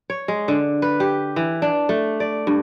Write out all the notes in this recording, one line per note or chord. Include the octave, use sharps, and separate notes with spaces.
C#5
G#3
D3
B4
G4
E3
D4
A3
D5
G2